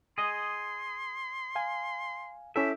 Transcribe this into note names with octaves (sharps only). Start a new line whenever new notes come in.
G#4 D#5 C6
F5 G#5
C#4 E4 G4 A4 E5